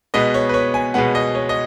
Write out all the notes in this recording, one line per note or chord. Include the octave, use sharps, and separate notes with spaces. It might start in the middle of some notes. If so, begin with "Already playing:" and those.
B2 G#3 B3 D#5
C#5
B4
C#5
G#5
B2 G#3 B3 F#5
D#5
C#5
D#5